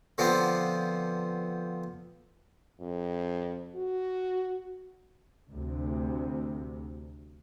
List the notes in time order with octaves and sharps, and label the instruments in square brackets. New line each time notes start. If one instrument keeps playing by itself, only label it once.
[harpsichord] D3 F3 B3 C4 D4
[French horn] F2
F#4
[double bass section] D2 C3